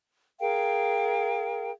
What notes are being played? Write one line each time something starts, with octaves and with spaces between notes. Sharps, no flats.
G#4 A#4 F5 G5